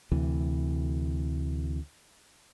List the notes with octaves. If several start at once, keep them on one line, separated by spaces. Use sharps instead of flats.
D2 C3 E3